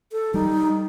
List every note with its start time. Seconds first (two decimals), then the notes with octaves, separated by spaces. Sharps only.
0.12 A4
0.34 G3 D#4